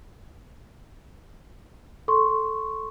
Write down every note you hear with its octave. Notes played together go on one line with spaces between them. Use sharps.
A4 C6 C#6